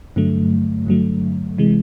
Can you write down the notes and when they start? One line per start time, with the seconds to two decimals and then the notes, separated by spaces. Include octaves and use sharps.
0.16 G2 D3 F#3 A3
0.86 G2 D3 F#3 A3
1.58 C3 E3 G#3